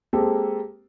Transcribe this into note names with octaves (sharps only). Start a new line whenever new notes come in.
G#3 A#3 C4 G4 A4 A#4